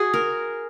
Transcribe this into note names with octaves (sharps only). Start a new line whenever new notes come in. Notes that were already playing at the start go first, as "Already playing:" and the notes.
Already playing: F#4 G#4
A#4